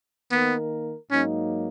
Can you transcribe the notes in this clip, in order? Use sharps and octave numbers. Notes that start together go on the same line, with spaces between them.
D#3 A#3 B3 D#4 A#4
G#2 F#3 A#3 C#4 D#4